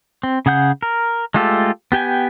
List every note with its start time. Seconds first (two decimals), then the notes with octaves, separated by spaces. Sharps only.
0.23 C4
0.46 C#3 G#4 F#5 G6
0.83 A#4
1.34 G#3 A3 F4 G4 A4
1.92 B3 G4 G5 G#5